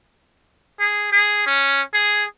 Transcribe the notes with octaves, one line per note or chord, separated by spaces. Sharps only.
G#4
G#4
C#4
G#4